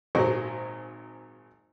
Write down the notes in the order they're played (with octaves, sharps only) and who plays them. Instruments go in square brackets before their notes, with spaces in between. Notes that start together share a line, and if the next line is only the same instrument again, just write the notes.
[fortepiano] G#1 A#2 F#3 G#3 C5 C#6